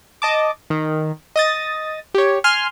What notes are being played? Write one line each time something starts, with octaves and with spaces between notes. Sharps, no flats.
D#5 A5 D6
D#3
D#5 D#6 A6
G4 C#5
G#5 C6 F6